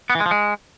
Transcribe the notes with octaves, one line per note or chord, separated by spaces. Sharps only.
B3
E3
G#3
F3
G#3